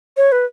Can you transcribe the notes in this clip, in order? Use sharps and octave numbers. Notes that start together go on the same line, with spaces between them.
C#5
B4